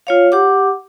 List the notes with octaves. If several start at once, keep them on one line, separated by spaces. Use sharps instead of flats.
F4 C#5 F5
G4 F#5 D6